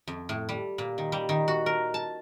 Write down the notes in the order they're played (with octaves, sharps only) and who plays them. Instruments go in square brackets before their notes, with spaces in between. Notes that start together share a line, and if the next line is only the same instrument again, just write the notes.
[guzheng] F2
A2
G3
A#2
D#3
G3
D#3
F#4
A#4
A5